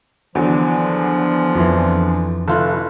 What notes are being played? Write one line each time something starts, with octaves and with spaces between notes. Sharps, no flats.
E2 D3 F3 F#3
F2 E3
F1 E4 F4 A4